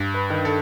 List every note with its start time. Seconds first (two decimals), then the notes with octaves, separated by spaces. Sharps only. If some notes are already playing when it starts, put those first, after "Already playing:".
Already playing: G2
0.14 B4
0.30 D#3
0.45 A4